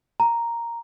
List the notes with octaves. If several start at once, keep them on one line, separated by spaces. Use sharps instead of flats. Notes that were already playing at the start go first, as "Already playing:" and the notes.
A#5